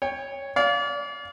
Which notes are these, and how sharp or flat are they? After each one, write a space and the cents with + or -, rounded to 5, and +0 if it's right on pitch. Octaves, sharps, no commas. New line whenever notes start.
C#5 +0 G5 +30
D5 -35 F5 +10